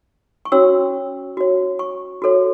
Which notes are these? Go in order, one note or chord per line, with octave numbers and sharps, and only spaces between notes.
C#6
C#4 F#4 C#5 E6
F#4 C#5
C#6
F#4 A4 C#5